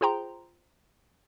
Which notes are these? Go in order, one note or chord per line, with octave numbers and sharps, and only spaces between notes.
F4 G#4 C5 G5 A#5 C6